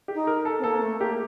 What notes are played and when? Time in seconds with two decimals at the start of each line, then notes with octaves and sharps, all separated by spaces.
0.08 G4
0.14 D#4
0.27 A#4
0.45 A4
0.59 C4
0.64 A#3 A4
0.82 A3
0.99 A#3 G4